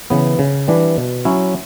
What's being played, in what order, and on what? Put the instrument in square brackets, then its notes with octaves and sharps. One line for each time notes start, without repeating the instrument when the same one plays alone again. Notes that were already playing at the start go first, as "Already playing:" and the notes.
[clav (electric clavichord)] C#3 E3 B3
C#3
E3 G3 D4
B2
F#3 C#4 E4